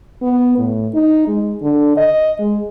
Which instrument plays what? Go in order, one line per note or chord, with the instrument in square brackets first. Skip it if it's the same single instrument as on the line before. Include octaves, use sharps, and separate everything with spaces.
[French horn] B3
A2
D#4
G#3
D3
D#5
G#3